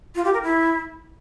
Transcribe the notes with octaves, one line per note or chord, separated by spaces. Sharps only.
F4
G4
A#4
E4